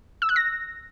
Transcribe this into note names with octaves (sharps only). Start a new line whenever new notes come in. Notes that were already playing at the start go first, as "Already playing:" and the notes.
E6
F#6
A#6